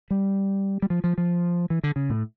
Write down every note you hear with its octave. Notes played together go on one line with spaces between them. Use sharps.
G3
G3
F3
F3
F3
E3
D3
C#3
A2